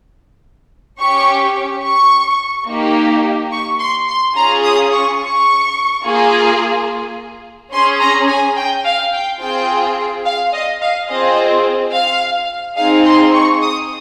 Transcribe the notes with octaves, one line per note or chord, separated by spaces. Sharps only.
C#4 G4 C#6
C#6
A#3 D#4 G4
C#6
C6
C6
C#4 F4 G#4 A#5
D#6
C#6
C#6
A#3 F4 G#4
C#4 G#4 C6
A#5
G#5
G5
F5
G5
C4 F4 G#4 G5
F5
D#5
F5
C4 F4 G#4 D#5
F5
C4 D#4 G#4 F5
C6
C#6
D#6